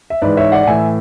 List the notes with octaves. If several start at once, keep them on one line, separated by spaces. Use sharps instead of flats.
E5
G#2 E3 B4 D5
C#5 E5
D5 F#5
F#5
A2 E3 E5 G#5